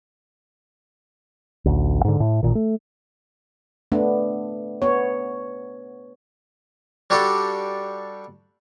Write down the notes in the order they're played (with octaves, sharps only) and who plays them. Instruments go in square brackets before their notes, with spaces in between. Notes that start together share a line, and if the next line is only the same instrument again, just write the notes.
[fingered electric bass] A1 D2
G#2 D3
A2
A1 A#2 D#3
A3
[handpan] A3 B3 D4
B3 C#5
[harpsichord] G3 D4 F#4 G4 A4 G5